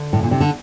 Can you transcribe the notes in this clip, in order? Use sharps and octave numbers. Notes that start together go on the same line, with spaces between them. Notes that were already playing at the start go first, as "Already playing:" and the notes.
Already playing: D3
A2
A#2
C3
D3